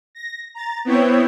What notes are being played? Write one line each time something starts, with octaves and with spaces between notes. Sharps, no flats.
A#6
A#5 A6
B3 C4 E4 C#5 G6